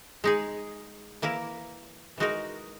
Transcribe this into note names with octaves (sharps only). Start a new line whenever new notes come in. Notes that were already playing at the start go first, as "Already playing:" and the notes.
G#3 D#4 G#4
E3 A#3 E4 A#4
E3 G#3 D#4 F#4 A#4